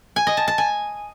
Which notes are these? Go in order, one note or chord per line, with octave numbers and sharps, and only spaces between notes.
G#5
D#5
A5
A5
G#5